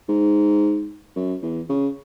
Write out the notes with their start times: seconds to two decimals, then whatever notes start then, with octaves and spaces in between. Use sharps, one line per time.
0.09 G#2
1.16 F#2
1.42 E2
1.69 C#3